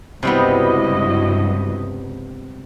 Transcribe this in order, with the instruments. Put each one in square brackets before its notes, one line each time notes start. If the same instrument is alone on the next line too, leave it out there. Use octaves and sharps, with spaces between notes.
[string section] C#2 G2 [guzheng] C3 G3 B3 [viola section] E4 F#4 D#5